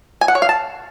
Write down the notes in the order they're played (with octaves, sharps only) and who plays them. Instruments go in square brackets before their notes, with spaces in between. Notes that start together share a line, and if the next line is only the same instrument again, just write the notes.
[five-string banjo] G#5
F#5
C#5
F5
A5